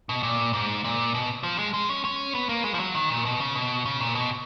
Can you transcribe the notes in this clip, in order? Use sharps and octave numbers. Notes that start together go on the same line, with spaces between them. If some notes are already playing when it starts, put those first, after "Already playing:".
B2
A#2
G#2
A#2
B2
F3
G#3
G#3
C#4
C#4
B3
A#3
G#3
F3
F#3
D#3
A#2
B2
C#3
B2
C#3
A#2
B2